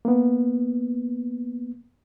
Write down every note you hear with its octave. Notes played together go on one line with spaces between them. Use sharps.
A#3 B3